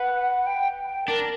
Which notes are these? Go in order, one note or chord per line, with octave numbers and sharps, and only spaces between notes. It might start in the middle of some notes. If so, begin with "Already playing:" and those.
Already playing: B4 F#5
G5
G5
D4 A#4